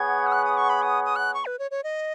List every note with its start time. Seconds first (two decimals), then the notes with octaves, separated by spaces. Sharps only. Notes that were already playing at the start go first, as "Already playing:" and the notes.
Already playing: B3 G#4 C#5 F#5 G#6
0.27 D#6
0.32 F#6
0.45 D#6
0.57 C#6
0.70 B5
0.82 D#6
1.05 D#6
1.16 F#6
1.34 C#6
1.46 B4
1.59 C#5
1.71 C#5
1.84 D#5